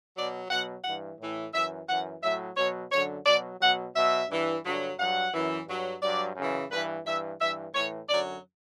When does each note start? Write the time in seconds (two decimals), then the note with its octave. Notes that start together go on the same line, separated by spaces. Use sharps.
0.16 B2 F#3 D5
0.50 B2 F#3 F#5
0.84 G2 E3 F#5
1.19 A2 E3
1.54 F#2 E3 E5
1.88 F#2 E3 F#5
2.23 A2 F#3 E5
2.57 B2 F#3 C#5
2.92 F#2 D3 F#3 C#5
3.26 B2 F#3 D5
3.61 B2 F#3 F#5
3.95 B2 F#3 E5
4.29 G2 E3
4.64 G2 D3 F#3
4.99 G2 F#3 F#5
5.33 F#2 E3
5.67 G2 F#3
6.02 G2 F#3 D5
6.36 F#2 C#3 E3
6.71 G2 E3 B4
7.06 G2 E3 E5
7.40 G2 E3 E5
7.75 A2 E3 C#5
8.09 F#2 D3 F#3 D5